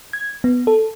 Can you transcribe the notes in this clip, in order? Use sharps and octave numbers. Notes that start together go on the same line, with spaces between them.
G#6
B3
A4